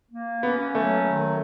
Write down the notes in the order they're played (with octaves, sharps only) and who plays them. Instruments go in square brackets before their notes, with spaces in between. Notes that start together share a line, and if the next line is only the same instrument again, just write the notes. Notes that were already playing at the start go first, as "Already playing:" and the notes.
[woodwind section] A#3
[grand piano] B3 [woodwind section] C#4
[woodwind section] F#3 [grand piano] A3
[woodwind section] D#3